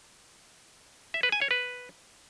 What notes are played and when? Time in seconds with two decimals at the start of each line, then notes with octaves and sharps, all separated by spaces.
1.14 E5
1.23 B4
1.32 G#5
1.42 C#5
1.51 B4